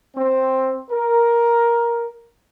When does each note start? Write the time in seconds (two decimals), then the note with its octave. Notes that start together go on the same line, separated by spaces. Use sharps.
0.16 C4
0.90 A#4